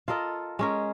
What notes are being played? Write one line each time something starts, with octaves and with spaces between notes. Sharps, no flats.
F4 A4 A#4 D#5
G#3 C#4 A#4